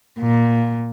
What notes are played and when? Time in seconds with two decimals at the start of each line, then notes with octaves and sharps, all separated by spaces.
0.19 A#2